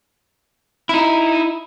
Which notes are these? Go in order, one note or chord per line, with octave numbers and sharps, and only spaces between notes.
D#4 E4